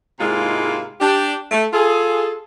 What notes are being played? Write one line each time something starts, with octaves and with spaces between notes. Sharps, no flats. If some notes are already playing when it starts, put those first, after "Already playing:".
G#2 C3 G#3 A#3 E4 F4
D4 G4
A3
F4 G#4 A4